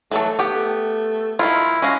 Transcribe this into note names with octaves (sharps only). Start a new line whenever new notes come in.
E3 F#3 A3 A4
B3 G4
A3
D#3 E4 F4
G#3 C#4 F#4 F5